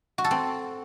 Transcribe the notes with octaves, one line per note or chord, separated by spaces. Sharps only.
F#4
A4
C4